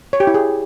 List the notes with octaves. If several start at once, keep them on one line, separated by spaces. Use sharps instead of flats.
C#5
G4
E4
G#4